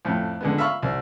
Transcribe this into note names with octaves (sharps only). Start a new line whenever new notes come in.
F2 A2
D3 G#3 B3
E5 F5 B5 C#6 F6
C2